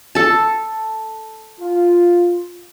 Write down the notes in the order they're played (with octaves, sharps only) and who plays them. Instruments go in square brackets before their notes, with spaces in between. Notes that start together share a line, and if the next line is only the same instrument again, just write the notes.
[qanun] A4 A5
[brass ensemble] F4